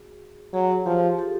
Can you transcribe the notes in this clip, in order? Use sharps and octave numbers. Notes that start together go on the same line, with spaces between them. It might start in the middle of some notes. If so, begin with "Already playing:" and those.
Already playing: F#4 G#4
F#3 F#4 G#4
F3 F4 G4
G4 A4